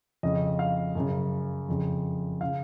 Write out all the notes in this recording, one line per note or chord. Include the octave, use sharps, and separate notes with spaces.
F2 C#3 D#5
F5
F#2 C#3
F2 C#3
C#3 F5